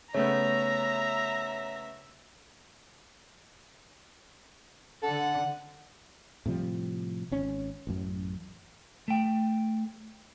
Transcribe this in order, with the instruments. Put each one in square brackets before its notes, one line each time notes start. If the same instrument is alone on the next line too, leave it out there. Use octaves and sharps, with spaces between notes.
[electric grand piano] C#3 A3 B3 [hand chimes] C#5 [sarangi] E5 [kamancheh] A#5
[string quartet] D3 F#5 [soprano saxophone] A4
[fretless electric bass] A2 C3 F3 G3
G#1 C#4
A1 F#2
[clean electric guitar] A3 G5